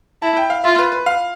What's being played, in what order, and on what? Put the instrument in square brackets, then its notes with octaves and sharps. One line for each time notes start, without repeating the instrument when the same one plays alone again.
[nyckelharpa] E4 [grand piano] A5
[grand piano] G5
F5
[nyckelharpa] F4 [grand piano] E5
[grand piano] B4
B4
F5